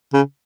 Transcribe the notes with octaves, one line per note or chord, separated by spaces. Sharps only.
C#3